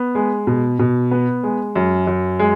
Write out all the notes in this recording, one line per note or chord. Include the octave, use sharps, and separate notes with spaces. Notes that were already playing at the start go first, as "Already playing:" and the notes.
Already playing: B3
G#3
B2
B2
B3
G#3
F#2
F#2
G#3